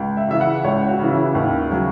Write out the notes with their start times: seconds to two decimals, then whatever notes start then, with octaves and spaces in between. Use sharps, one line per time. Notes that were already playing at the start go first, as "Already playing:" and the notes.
Already playing: C#2
0.17 E5
0.28 C#3 E3 E5
0.41 F#5
0.64 C#2 C#5
0.88 F#4
0.99 C#3 E3
1.11 E4
1.35 D#2
1.70 C#3 F#3